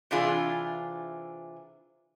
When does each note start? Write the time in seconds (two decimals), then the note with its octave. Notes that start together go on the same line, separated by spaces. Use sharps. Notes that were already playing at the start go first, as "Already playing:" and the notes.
0.11 C3 E3 D4 F4 G#4